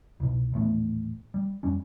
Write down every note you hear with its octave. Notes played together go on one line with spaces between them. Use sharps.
C2 B2
D#1 A1 A3 B3
G3
F2 G3 C#4